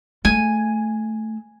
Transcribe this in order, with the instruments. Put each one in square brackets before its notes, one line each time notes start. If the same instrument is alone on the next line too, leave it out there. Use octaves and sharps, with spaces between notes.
[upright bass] A3 [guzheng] G#5